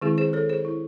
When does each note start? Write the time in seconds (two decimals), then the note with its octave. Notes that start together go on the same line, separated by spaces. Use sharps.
0.01 D#3 G#3 C4 E4 G#4
0.18 G#4 C5
0.33 A4 C#5
0.49 G#4 C5
0.65 E4